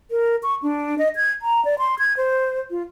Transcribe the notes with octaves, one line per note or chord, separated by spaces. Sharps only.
A#4
C#6
D4
D#5
G#6
A#5
D5
C6
G#6
C5
F4